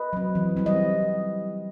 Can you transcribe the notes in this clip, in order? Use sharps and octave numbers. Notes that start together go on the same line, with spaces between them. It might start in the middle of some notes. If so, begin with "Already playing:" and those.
Already playing: B4 D#5
F#3 C4
E3
G3 C4
D#5